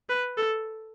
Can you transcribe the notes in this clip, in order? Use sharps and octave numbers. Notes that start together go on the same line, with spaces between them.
B4
A4